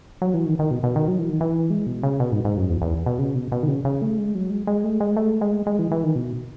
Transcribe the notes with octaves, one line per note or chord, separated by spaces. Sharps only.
F#3
E3
D#3
D#3
B2
B2
D#3
F#3
E3
D#3
E3
G#3
B2
C#3
B2
G#2
G#2
F#2
E2
E2
B2
C#3
B2
B2
D#3
C#3
C#3
A3
G#3
F#3
G#3
G#3
A3
G#3
A3
G#3
G#3
E3
E3
D#3
B2